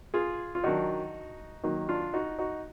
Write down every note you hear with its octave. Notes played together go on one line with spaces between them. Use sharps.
F4 G#4
F4
D#3 F#3 D4 D#4 F#4
D#3 F#3 A#3 D#4
D4 F4
D#4 F#4
D#4 F#4